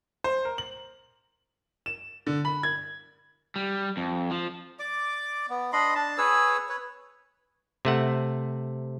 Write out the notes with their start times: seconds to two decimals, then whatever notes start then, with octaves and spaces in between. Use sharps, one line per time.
0.24 C5
0.45 A#4
0.58 F#7
1.86 E7
2.27 D3
2.45 B5
2.63 G#6
3.56 G3
3.97 F2
4.31 F3
4.80 D5 D6
5.50 B3
5.73 D4 D#5 B5 C6
5.95 D4 A5
6.18 G#4 B4 C#5 E6
6.69 B4 C#5
7.85 C3 A3 F#5